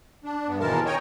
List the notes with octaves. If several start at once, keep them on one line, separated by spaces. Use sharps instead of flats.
D4
G2 B3
D#2 B2 E3 G#3 A#4 A5
C#5 D#5 G5 G#5 A#5